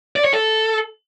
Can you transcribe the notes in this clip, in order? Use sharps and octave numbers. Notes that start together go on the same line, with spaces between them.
D5
C#5
A4